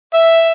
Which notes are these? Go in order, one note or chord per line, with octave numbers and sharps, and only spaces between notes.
E5